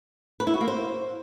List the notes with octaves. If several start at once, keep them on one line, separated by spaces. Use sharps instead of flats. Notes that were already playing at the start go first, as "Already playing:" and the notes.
B4
E4
F#4
A#3
C5